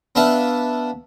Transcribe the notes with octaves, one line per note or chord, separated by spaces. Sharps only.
B3 D4 B4 E5 F5 A5